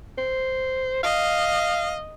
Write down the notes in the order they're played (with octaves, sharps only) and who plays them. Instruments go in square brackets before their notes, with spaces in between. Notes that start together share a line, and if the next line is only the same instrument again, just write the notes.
[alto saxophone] C5
[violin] D#5 [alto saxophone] F5